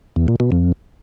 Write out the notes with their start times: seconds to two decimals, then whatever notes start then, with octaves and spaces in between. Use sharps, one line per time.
0.16 E2
0.28 A#2
0.40 B2
0.52 F2